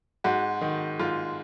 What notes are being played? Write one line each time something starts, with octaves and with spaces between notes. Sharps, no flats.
G#2 F#4
D#3
G#2 F4